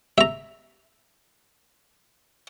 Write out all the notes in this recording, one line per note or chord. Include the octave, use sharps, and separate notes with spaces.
E5 A#5